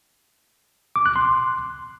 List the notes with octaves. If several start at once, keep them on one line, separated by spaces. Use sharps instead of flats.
D6
F#6
C6